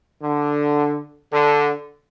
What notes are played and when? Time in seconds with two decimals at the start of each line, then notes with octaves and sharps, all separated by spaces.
0.22 D3
1.33 D3